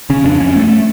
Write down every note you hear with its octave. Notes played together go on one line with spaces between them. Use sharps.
C#3 C#4
F2 D4
F2 C#4
G2 A3